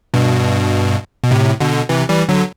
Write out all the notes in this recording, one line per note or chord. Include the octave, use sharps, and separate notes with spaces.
G2 B2
B2
A2 C3
B2 D3
C3 E3
E3 G3
D3 F#3